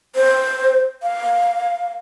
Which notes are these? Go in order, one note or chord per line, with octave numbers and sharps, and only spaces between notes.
C5
F5